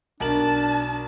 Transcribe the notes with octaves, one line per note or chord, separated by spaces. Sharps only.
B1 D4 A#4 A5 F#7